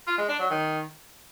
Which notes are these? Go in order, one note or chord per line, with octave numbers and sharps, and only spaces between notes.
F4
G#3
D4
F#3
D#3